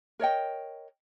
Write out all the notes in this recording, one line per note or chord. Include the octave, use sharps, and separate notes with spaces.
A#4 C#5 D#5 G5